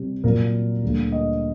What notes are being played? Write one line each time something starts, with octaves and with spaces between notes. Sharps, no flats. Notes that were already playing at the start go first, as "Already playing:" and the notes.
Already playing: C3 G3
A#2 F#3 A#3 A#4
D2 D3 G3 A#3
D#5